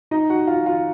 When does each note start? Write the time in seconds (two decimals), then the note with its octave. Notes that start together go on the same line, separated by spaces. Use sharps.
0.11 D#4 D#5
0.30 F#4 F#5
0.47 F4 F5
0.66 F4 F5